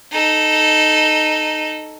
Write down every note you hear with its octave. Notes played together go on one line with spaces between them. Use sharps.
D#4 A4